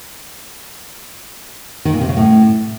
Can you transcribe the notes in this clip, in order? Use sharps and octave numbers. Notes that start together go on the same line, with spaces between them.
D#3
A#2
C3
C#3
A2